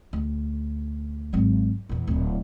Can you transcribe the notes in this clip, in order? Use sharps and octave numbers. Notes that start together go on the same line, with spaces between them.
D2
G#1 F#3
E2 A#2
D1 A#2